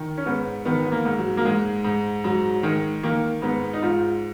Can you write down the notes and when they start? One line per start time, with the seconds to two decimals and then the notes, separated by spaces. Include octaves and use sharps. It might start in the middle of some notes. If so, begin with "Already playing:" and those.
Already playing: D#3
0.17 C#4
0.25 G#2 B3
0.65 D#3 B3
0.85 B3
0.92 A#3
1.05 G#2
1.18 F#3
1.37 A#3
1.45 G#2 G#3
1.84 G#2
2.24 G#2 F#3
2.63 D#3 G#3
3.03 D#3 A#3
3.42 G#2 B3
3.73 D#4
3.82 G#2 F4